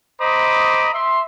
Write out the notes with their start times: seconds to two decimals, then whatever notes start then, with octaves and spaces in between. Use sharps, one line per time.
0.21 C5 D#5 A#5 B5 D6 D#6
0.94 E5 C6